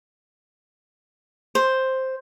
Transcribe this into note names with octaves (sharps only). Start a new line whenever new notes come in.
C5